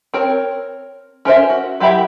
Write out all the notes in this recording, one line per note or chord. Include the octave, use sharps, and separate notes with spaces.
C4 A#4 C#5
C#4 A#4 C5 E5
F#4
F#3 E4 G4 E5 B5